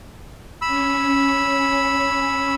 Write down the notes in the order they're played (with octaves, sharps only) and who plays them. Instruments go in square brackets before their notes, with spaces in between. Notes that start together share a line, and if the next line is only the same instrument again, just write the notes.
[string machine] C#4 [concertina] B5 E6